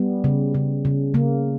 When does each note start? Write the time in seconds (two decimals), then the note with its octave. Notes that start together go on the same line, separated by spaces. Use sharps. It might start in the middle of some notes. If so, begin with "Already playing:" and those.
Already playing: G3 B3
0.24 C#3
0.55 C#3
0.85 C#3
1.14 C#3 A#3